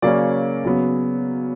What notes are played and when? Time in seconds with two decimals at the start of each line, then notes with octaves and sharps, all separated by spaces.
0.02 C#3 F#3 A#3 C#4 D5
0.64 C#3 F#3 B3